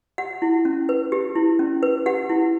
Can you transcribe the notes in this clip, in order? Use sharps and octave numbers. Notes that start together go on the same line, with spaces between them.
G4 F#5
E4
C#4
B4
G4
E4
C#4
B4
G4 F#5
E4